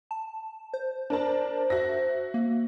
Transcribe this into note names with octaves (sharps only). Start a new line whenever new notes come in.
A5
C5
D4 A#4 A5
F#4 E5 A#6
A#3